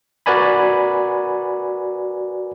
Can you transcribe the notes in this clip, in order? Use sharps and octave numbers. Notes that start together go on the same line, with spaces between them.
F#4 A#4 B4 D5 G#5 B5